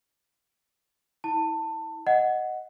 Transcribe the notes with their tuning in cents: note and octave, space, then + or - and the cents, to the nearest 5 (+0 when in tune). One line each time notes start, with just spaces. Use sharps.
E4 -30 A5 +20
D#5 +0 F#5 +0